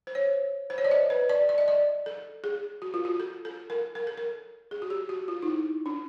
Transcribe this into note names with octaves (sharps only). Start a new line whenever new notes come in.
C5
C#5
C5
C#5
D5
D#5
B4
D5
D5
D#5
D5
A4
G#4
F#4
F4
F#4
A4
A4
A#4
A#4
A4
A#4
G#4
F#4
G4
F#4
F4
D#4
E4
D4